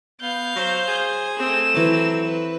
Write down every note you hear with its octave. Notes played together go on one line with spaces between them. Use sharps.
B3 F5 G6
F#3 C5
G#4
A3 C4 E7
E3 F#3 D6
B4